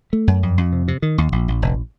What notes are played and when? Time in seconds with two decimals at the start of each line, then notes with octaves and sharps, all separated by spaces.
0.13 A3
0.27 F#2
0.43 F2
0.58 F2
0.73 C3
0.88 C3
1.02 D#3
1.18 D#2
1.32 A#1
1.48 A#1
1.62 F1